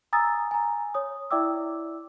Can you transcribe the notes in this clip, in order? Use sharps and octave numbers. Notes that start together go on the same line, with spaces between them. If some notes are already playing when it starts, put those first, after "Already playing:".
G#5 A#5 D#6 E6 A6
G#5 A#5
C#5 D#6
E4 D5 E5 G5 D6 E6